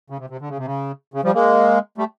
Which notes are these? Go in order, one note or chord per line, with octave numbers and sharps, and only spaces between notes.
C#3
C3
C3
D3
C#3
C3
C#3
C#3
F3 G3
G#3 A#3
G3 A3